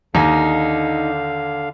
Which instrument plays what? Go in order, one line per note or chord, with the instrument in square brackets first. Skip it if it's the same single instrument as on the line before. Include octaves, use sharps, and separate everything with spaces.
[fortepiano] D#2 [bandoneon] D3 F5 [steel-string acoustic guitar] D#4